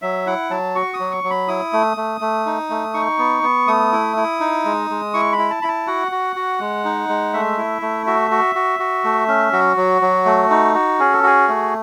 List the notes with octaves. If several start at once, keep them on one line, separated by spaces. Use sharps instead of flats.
F#3 E5
E4 F#5
F#3 A5
F#4 C#6
D#6
F#3
C#6
F#3
B5
E4 D#6
A3
A3
A3
D#4
A3
D#4 C#6
B3
B3
A3 D#6
E4
E4
D#4
G#3
G#3
E4 C#6
B5
E4
A5
E4 B5
A5
F#4 F#5
F#4
F#4
G#3
D#4
G#3
A3 E5
E4
A3
F#4 E5
F#4
F#4
F#4
A3
C#4
F#3 F#4
F#3
F#3
A3
D#4
F#4
C#4 G#4
A4
F#4 G#4
A3